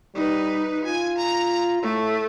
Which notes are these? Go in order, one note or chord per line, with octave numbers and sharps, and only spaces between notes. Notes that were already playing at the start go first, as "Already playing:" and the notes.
G3 D#4 B4
F4 G#5
A#5
A2 A3